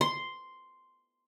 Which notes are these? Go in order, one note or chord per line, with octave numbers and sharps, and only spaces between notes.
C6